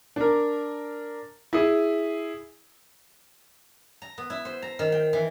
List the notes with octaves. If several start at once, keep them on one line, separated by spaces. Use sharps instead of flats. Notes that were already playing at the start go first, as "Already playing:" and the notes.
D4 A#4
E4 G#4
A#5
B3
E4
C5
A#5
D#3
G5
E3